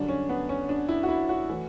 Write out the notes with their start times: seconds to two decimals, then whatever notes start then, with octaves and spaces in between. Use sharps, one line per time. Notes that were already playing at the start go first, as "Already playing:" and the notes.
Already playing: F#2 D3 G3 D4
0.08 C#4
0.29 B3
0.49 C#4
0.69 D4
0.89 E4
1.03 F#4
1.09 E4
1.29 F#4
1.49 E3 A3